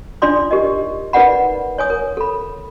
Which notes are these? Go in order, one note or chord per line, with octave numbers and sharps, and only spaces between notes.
D4 D#4 F4 D5 C6 D#6
G4 A#4 D#5
D#4 A#4 B4 D5 F#5 B5
C#5 G#5 D#6
A#4
A4 B5